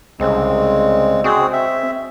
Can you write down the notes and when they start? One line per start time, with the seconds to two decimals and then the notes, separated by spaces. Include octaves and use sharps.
0.20 C2 C#3 G#3 C4
1.24 C4 F#4 G#4
1.53 E5